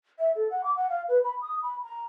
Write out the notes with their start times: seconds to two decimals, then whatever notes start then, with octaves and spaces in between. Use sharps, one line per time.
0.19 E5
0.35 A4
0.50 F#5
0.64 D6
0.76 F#5
0.89 F5
1.08 B4
1.24 B5
1.41 D#6
1.62 B5
1.82 A#5